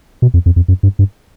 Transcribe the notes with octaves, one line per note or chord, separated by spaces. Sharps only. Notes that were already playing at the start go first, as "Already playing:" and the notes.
B2
F2
F2
F2
F#2
G2
G2